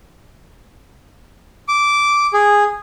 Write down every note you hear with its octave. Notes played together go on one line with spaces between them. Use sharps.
D6
G#4